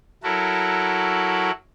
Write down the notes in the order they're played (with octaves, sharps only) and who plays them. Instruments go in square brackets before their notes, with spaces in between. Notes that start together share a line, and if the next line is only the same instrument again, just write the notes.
[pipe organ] F#3 E4 F#4 A4 A#4